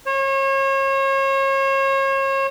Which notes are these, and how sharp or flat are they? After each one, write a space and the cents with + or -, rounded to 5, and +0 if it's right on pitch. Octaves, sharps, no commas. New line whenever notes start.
C#5 -35